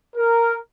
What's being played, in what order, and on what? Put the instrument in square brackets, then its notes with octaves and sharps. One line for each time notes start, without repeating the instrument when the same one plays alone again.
[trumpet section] A#4